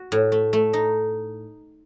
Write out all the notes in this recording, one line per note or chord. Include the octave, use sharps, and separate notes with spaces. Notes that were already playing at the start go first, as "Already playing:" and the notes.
Already playing: F#4
A2
A3
A3
D#4